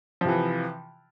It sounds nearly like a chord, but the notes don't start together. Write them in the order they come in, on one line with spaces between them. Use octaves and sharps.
F3 C3 E3